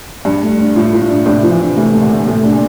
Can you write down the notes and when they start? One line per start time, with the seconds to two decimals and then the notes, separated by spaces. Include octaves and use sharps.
0.25 G2 D4
0.43 A3
0.58 D4
0.76 A2 F4
0.93 F4
1.01 A2
1.09 D4
1.26 A2 C3 D4
1.43 F3
1.52 C3 E3
1.60 D4
1.77 C3 E3 A3
1.93 A3
2.01 A#2 D3
2.11 A3
2.19 A#2
2.27 A2 C3 A3
2.44 D4
2.53 A#2